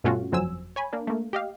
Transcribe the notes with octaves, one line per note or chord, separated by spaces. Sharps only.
G2 B2 A3 C#4 F4 F#4
G1 F2 F#3 C5 G#5 E6
C#5 G#5 B5
A#3 D4
A3 A#3
G4 D#5 F5